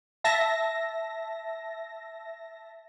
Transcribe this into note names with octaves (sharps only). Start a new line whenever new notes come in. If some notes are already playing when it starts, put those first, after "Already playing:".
E5 A5 A#6